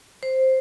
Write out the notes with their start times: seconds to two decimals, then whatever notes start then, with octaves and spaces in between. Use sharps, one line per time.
0.23 C5